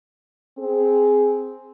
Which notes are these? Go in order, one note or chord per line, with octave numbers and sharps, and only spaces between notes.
C4 G#4